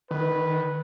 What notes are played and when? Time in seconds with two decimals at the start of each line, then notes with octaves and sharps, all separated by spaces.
0.11 D#3 B4